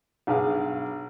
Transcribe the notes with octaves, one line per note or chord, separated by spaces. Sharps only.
B1 G2 G#4 F5